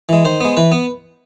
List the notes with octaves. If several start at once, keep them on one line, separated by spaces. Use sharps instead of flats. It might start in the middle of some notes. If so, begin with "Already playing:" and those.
E3 G#3
D#3 C5
G#3 B3
E3 B4
B3